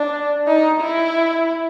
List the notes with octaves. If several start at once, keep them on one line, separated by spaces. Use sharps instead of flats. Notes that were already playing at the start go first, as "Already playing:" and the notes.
Already playing: D4
D#4
E4